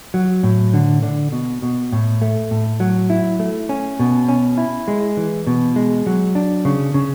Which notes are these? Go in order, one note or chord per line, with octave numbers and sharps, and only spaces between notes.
F#3
A2
D3
D3
B2
B2
A2
A3
A2
F#3
E4
A3
C#4
B2
C#4
E4
G#3
E3
B2
G#3
F#3
D4
C#3
C#3